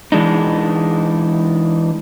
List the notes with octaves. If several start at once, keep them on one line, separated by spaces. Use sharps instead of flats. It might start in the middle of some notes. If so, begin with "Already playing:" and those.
E3 G#3 D4 D#4